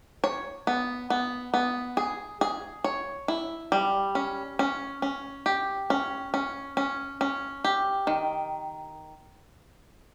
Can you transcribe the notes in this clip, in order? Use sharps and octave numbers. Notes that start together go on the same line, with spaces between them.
C#5
B3
B3
B3
G#4
G#4
C#5
E4
G3
C#4
C#4
C#4
G4
C#4
C#4
C#4
C#4
G4
D#3